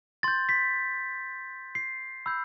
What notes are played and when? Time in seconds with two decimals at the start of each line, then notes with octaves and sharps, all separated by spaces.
0.23 C6 G6 A6
0.49 B6
1.75 C7
2.26 B5 E6 G6